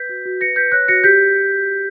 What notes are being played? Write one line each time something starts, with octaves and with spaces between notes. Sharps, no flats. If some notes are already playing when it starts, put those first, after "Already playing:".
Already playing: B4 G6 B6
F#4
F#4
B4 A#6 C#7
B4 G6 B6
C#5 F#6 A#6
F#4 A#6 C#7
G4 G6 B6